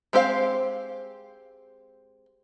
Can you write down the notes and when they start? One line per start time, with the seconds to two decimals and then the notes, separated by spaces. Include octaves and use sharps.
0.13 G#3 C4 G4 C5 F5